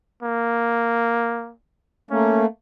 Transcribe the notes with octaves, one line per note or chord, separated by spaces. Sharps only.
A#3
A3 A#3 C#4